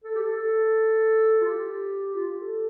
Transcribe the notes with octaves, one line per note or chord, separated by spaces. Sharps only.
A4
G4
A4
A4
F4
G4
F4
G4
A4